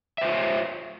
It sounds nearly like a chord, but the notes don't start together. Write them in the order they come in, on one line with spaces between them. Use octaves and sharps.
E5 C5 F4 C#5